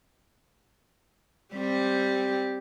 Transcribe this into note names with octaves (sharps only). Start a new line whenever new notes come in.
G3 C4 G4